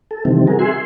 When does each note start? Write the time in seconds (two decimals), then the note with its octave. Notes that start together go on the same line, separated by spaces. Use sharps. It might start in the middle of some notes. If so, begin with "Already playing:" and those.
0.11 A4
0.25 C3 D#3 E3 G3 C4
0.47 F#4 G#4 A#4
0.59 G#4 E5 F#5 G#5 C6
0.71 C6